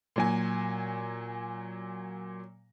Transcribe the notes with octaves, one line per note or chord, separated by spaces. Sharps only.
A#2 F#3 G#5